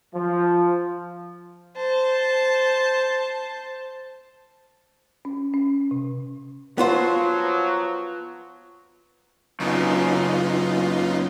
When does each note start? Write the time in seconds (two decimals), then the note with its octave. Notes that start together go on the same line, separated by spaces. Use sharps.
0.15 F3
1.76 C5 A5
5.25 C#4
5.54 C#4
5.91 C3
6.78 F3 F#3 B3 F4 C5
9.60 F#2 C#3 B3 D#4 F4